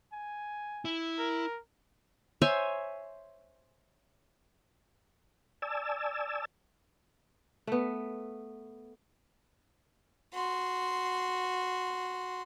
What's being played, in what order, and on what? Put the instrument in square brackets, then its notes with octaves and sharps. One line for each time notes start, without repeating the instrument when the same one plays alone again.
[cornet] G#5
[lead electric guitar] E4
[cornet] A#4
[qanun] C5 C#5 E5 G#5
[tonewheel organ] D5 G#5 A5 E6
[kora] A3 B3
[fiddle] F#4 C6